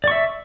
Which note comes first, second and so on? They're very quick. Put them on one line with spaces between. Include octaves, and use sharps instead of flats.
D5 C#6 E5